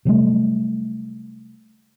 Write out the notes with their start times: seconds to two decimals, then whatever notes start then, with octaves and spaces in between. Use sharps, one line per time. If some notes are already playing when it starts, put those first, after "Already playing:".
0.05 C3 F#3 G3 A3